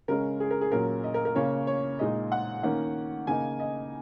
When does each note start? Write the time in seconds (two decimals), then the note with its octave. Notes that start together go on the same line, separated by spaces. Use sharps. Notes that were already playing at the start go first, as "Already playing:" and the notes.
0.08 C#3 G#3 C#4 A#4
0.40 G#4
0.51 A#4
0.61 G#4
0.72 A#2 F#3 C#4 A#4
1.03 D#5
1.14 A#4
1.25 A#4
1.35 C#3 A#3 C#4 C#5
1.67 C#5
1.99 A#2 G#3 D#4 D#5
2.32 F#5
2.63 D#3 A#3 C#4 F#5
3.27 C#3 A#3 D#4 G#5
3.60 D#5